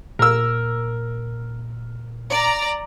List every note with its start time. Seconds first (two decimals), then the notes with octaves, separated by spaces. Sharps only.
0.19 A#2 A#4 E6
2.32 D5 A#5